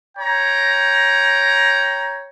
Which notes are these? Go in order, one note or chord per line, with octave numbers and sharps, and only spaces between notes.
C#5 G5 A#5